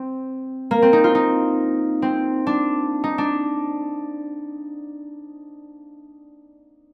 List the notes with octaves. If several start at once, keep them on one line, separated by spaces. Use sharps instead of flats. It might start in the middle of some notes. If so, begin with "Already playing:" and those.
Already playing: C4
A#3
C4
D#4
F4
D#4
C4
D4
D#4
D4